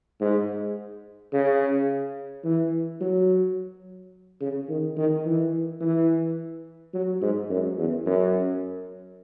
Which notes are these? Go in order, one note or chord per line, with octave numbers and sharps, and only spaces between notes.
G#2
C#3
E3
F#3
C#3
D#3
D#3
E3
E3
F#3
G#2
F#2
E2
F#2